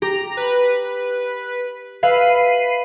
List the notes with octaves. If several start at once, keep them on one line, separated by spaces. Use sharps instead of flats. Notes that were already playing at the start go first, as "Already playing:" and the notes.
G4 A#5
B4
B4 E5 F5 B5 C7 D#7